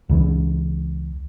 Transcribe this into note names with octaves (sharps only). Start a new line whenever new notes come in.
C#2 C#3 E3